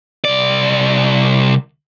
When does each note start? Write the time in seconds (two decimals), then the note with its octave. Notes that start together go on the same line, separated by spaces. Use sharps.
0.25 C2 D5